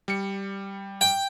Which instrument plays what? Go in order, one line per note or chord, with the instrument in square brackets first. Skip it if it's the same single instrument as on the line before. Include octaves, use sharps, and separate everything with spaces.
[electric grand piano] G3 C#7
[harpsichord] G5